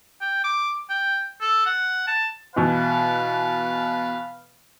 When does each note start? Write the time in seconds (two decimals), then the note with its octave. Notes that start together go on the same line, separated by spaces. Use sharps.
0.21 G5
0.44 D6
0.90 G5
1.41 A4
1.66 F#5
2.07 A5
2.56 B2 E3 B4 F5